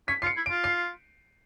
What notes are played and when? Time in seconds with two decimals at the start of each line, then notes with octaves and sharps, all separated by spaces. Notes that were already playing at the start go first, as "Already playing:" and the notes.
0.08 C#4 B6
0.22 F4 C7
0.27 C#7
0.36 E4
0.46 F4 D7
0.64 C7